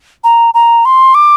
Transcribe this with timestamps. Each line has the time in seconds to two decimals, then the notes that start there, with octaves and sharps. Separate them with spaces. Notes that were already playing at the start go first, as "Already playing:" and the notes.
0.24 A#5
0.54 A#5
0.85 C6
1.14 D6